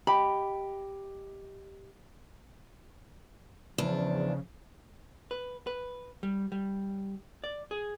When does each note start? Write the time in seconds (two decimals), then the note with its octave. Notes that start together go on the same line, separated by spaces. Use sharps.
0.07 G4 D#5 G5 B5
3.78 E2 C#3 F3 D4
5.31 B4
5.67 B4
6.23 G3
6.52 G3
7.44 D5
7.71 G#4